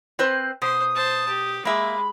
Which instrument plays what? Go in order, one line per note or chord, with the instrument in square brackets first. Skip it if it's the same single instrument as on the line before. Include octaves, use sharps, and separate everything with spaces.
[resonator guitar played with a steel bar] C4 B4 C5
[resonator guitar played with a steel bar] B2 [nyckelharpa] C5 [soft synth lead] D#6
[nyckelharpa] C5 A5
G4
[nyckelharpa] G#3 [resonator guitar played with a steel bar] A#3 E5 [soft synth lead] B5